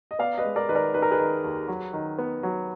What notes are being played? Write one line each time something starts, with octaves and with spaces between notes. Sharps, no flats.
D#5
B3 D5 F5
B4 D#5
G#3
A#4 D5
D#3 B4
A#4 D5
D#3 B4
A#4
G#4 B4
D#3
D#2
F#3
D#3
B3
F#3